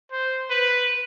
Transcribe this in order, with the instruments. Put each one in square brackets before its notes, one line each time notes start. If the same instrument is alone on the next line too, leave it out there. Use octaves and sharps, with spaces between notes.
[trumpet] C5
B4